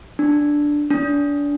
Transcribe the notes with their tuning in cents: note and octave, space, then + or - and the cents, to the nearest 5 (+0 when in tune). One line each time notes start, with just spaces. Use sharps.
D4 +0
D4 -30